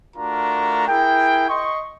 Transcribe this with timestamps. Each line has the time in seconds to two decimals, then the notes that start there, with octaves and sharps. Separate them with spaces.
0.17 A3 D4 F4 F#4 A#4 A#5
0.88 E4 G#4 A#4 G5
1.49 D#5 C6 C#6